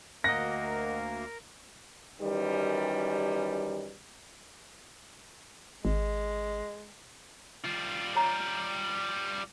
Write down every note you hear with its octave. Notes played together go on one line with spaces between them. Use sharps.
D2 A#3 A#4 D#5 F#5 A#6
F#2 D#3 E3 G3
G#1 G#3
G3 F4
C#5 A#5